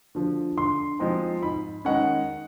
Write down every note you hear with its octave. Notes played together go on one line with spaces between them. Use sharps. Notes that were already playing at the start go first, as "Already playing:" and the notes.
D3 F3
D3 C6
F3 G#3 C4 D#4
G#2 B5
D#3 G#3 C#4 F#5